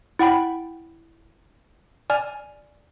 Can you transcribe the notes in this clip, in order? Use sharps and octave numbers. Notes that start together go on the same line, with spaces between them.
E4 F#5 G5 B5
D5 G#5 F6